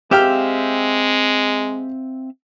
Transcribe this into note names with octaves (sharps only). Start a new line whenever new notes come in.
G#3 C4 G4 E5 F5 G5 F6